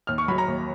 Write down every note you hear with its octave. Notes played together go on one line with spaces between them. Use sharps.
D#2 F6
C#6
F#3 B5
A#5
D#2